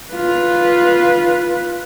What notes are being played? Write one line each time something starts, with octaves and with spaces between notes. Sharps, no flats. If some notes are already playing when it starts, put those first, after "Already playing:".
F4 B4